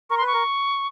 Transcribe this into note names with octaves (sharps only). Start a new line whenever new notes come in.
A#4 C#6
C6
B4
C#6
A#4